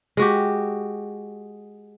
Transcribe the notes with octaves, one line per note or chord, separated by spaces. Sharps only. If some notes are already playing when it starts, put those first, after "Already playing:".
G#3 F#4 G4